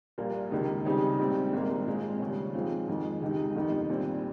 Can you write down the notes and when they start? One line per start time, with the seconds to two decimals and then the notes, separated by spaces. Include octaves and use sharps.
0.18 A#1 A#2 G3 A#3 F4
0.51 C#2 C3 D#3 A#3
0.85 C#3 G3 C4 D#4 G4
1.19 A#1 G#2 G3 C4
1.53 G#1 G#2 G3 A#3
1.87 A#2 G#3 C4 F4
2.20 D#2 C#3 G3 C#4
2.54 G#2 F3 G#3 C4 F4
2.88 F2 D#3 G#3
3.22 C#2 C3 D#3 G#3 D#4
3.55 G1 F2 C3 D#3
3.89 A#1 A#2 G3 C4